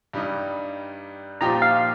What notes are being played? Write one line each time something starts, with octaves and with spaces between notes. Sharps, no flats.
G2 G3 D#4
A#2 F3 D#4 G4 A#5
F5